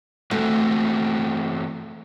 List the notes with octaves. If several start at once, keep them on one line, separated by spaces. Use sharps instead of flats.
E3 A3 C4 F#4